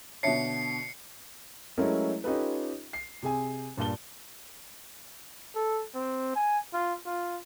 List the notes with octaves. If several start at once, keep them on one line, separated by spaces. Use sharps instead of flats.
B2 D3 C#5 E5 A5 C7 C#7
F#3 G#3 A3 C#4 E4 A#4
C#4 D#4 F4 G4 A4 B4
C7
C3 G#4 G#5
G2 A#2 F4 A5 G7
A4
C4
G#5
F4
F4